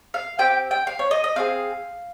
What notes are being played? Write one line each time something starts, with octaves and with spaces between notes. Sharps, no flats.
F5
C4 G4 G5
G5
F5
C#5
D#5
D#5
C4 F4 G#4 F5